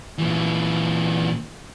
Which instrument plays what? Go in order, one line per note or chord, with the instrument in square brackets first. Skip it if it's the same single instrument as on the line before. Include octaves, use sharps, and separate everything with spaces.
[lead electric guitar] A#2 E3